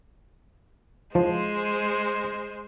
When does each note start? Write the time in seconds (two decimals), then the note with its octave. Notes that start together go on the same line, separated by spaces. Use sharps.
1.15 F3 G#3 C5